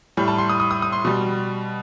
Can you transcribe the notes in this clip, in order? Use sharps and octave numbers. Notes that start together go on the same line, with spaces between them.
A2 G3
A5
C6
D#6
D#6
D#6
D#6
C6
B2 G3